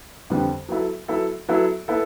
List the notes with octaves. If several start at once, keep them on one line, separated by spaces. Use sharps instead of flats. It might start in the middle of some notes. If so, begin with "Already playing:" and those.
F2 D3 G3 B3
F#3 B3 E4 A4
F#3 B3 E4 A4
F#3 B3 E4 A4
B3 E4 A4